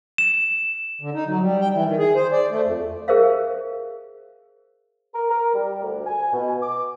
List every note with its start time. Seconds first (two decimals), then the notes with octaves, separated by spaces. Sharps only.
0.18 E7
1.01 D3
1.14 D#4
1.27 F#3
1.41 G3
1.61 G5
1.73 E3
1.86 D#3
1.99 G#4
2.16 C5
2.32 D5
2.51 A3
2.65 F2
3.08 G#4 A#4 C5 E5 F5
5.14 A#4
5.30 A#4
5.54 G3
5.82 D2
6.07 G#5
6.32 B2
6.62 D6